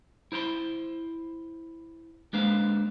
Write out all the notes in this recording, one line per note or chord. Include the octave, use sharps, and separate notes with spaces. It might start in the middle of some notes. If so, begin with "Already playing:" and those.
E4 C5 A#5 C6
G#3 A#3 D4 B4 C5 F5